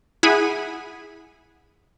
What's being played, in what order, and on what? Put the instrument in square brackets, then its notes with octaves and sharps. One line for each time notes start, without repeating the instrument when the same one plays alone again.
[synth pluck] E4 G#4 F#5 G#5 B5